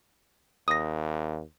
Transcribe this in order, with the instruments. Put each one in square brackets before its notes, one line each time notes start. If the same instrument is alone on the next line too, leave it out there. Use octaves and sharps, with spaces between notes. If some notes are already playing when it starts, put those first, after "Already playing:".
[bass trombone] D#2 [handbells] D#6 A#6